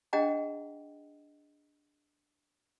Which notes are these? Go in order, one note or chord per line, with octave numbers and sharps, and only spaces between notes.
D4 G#4 D#5 F#5 G5 A#5